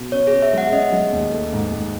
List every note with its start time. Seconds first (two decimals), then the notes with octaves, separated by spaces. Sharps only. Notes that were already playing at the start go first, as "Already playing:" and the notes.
Already playing: B2
0.12 C#4 C#5
0.27 G#4
0.32 C#4
0.42 E5
0.53 G#3 F#5
0.72 C#4 D#5
0.92 G#3
1.13 D#2
1.32 A3
1.53 G#2
1.72 G#2